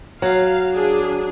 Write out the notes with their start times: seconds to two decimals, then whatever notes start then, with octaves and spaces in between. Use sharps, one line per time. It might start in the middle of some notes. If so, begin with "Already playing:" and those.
0.22 F#3 F5
0.74 D4 G#4